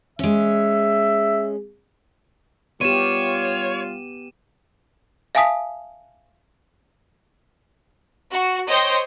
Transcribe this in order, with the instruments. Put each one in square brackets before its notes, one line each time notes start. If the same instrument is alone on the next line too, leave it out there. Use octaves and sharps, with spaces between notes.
[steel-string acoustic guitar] G#3 C#4 [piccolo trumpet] E5
[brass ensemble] G3 F4 [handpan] B3 G4 [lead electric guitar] C#5 [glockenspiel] D#7 E7
[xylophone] E5 F5 G#5 A5 D#6 B6
[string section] F#4
C5 C#5 D#5 G5 C6